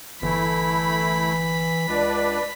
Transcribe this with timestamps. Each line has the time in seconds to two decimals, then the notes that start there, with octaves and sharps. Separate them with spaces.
0.22 G1 E3 A3 E4 B5
1.88 C#2 D4 B4 D5